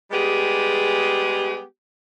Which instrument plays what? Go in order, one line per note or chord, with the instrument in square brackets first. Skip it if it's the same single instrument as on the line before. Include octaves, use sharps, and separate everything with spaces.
[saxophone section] G3 G#3 B3 G4 G#4